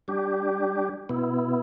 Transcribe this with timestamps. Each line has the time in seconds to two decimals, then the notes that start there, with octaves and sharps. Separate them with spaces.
0.08 G3 D4 G4
1.09 B2 B3 E4